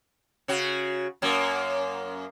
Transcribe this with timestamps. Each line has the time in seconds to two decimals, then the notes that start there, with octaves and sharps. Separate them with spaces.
0.48 C#3 F#4
1.22 F#2 A#3